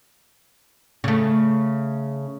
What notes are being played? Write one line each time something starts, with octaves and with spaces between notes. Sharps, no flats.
C#3 A3